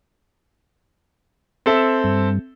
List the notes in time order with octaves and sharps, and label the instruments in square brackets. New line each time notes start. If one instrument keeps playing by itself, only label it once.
[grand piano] C4 A4 E5
[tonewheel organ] G2